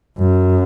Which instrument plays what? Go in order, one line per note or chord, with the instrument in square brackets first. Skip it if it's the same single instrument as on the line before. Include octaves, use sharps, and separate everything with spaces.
[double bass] F#2